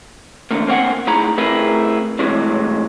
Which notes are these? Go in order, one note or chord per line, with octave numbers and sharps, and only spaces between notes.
E2 G#2 D3 A3 A#3
A#3 C4 C#5 F#5 G#5
B1 A2 D#4 G#4 A#5 B5
A3 C4 E4 G#4 A#4 B4
B1 A2 C3 E3 F#3 G#3